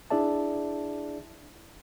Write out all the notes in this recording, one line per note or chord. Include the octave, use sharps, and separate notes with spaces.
D4 E4 G#4 D5 E5 A5